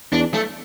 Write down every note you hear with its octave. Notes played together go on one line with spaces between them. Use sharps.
E2 D4
A3